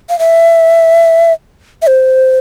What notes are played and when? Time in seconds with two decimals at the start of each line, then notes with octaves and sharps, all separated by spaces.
0.09 F5
0.19 E5
1.82 E5
1.87 C5